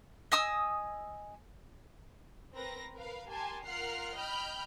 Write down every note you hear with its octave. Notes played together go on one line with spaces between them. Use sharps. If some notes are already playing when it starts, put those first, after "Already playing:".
D#5 G#5 D#6 E6
C4 A#4 B4 A#6
A#4 B4 F5
G4 A#4 G#5 A5 C6
F4 A#4 F#5 F6 C7
D#5 G5 B5 F6 G6